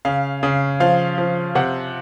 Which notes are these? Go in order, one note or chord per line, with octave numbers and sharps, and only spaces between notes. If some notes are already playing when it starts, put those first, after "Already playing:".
C#3 F5
C#3
F3 F5
F3
C3 F#5